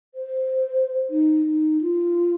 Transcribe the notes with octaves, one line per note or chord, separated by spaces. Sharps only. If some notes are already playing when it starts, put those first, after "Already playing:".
C5
D#4
D#4
F4